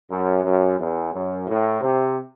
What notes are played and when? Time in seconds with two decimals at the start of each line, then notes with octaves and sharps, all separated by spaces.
0.11 F#2
0.45 F#2
0.79 E2
1.14 F#2
1.48 A2
1.81 C3